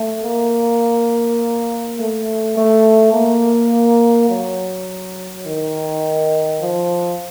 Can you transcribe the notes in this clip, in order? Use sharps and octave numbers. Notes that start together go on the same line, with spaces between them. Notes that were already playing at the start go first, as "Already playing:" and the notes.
Already playing: A3
A#3
A3
A3
A#3
F#3
D#3
F3